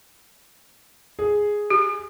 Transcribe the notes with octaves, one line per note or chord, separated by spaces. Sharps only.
G#4
G4